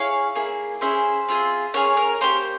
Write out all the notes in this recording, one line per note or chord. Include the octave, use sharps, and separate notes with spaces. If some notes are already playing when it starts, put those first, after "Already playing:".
Already playing: C#4 E4 G#4 C#5 F5
A#3 E4 G#4
C#4 E4 G#4 C5 E5
C4 F4 G#4
C#4 F4 G#4 A#4 C#5
A#4
A#3 C#4 G4 C5